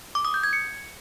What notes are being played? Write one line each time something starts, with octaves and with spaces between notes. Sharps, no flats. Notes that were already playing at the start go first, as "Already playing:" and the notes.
D6
D#6
G6
G#6
C#7